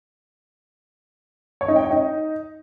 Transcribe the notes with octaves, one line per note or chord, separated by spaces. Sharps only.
C#5
D#4
G5
C#5
D#4